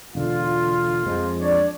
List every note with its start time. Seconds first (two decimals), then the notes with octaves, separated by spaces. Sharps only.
0.15 E1 D3 F4
1.06 F2 F3 G#3
1.40 D4 C#5 D5